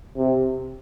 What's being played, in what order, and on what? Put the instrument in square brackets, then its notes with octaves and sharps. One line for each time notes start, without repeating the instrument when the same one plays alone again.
[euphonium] C3